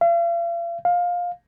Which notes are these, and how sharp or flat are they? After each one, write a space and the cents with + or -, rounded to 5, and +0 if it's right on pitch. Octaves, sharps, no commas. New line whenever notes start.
F5 -45
F5 +15